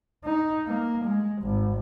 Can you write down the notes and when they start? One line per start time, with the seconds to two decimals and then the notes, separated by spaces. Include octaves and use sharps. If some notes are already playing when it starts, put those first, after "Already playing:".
0.24 D#4
0.67 A#3
1.04 G#3
1.42 G#1